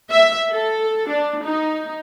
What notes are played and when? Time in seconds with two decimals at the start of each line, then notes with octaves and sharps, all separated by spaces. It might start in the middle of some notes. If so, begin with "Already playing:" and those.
0.11 E5
0.53 A4
1.09 D4
1.45 D#4